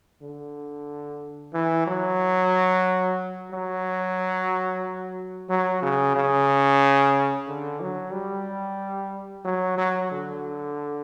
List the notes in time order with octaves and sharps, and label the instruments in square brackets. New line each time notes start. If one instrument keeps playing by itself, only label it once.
[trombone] D3
E3
F#3
F#3
F#3
C#3
C#3
D3
F#3
G3
F#3
F#3
D3